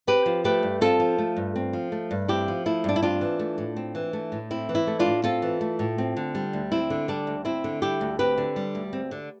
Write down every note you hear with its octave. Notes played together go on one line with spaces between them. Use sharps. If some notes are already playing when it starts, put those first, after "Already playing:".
C4 G4 B4
F3
A3 G4 B4
G2
C4 F4 A4
F3
A3
G2
C4
F3
A3
G2
C4 E4 G4
F3
A3 E4
G2 D4
E4
C4 D4 F4
E3
A3
A2
C4
E3
A3
A2
C4 E4
E3
E4
A3
D4 F4
A2
C4 F4 A4
E3
A3
A2
C4
D3
G3
D2
C4 E4
D3
G3 D4
D2
C4 E4
D3
G3 E4 G4
D2
C4 G4 B4
D3
G3
D2
C4
D3